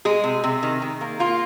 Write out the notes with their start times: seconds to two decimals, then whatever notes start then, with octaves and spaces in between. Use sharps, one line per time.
0.05 G#3 G#4
0.24 C3
0.44 C3
0.63 D#3
0.82 D#3
1.01 A#3
1.20 A#3 F4